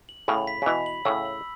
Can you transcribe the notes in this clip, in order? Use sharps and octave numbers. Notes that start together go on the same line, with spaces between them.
F#7
A2 C#3 B5
B6
C#3
B2 E3 B5
F#7
A2 C#3 E6
F#7